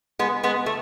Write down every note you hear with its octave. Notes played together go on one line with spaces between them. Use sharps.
G#3 B3
G#3 B3
A3